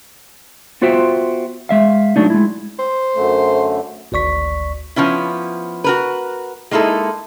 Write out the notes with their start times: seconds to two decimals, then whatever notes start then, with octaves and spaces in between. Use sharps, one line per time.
0.82 B3 F4 F#4 C5 E5 G5
1.69 G#3 E5 F5
2.16 F#3 A3 D4 D#4
2.30 G#3 E4
2.79 C5
3.15 F#2 D3 A3
4.12 G#1 D2 D5 C#6 B6
4.96 F3 B3 C#4 E4
5.84 F#4 A#4 B4
6.71 G#3 A#3 D#4 E4 A4